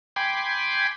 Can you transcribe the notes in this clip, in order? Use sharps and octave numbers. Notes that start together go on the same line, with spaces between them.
G5 G#5 B5 C6 D6